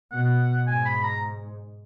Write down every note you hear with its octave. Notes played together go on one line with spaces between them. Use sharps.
B2 F#5
G#2 G#5
B5
A#5